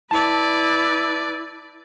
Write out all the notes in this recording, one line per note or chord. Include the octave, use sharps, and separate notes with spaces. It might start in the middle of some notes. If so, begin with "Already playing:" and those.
E4 B4 D5 A5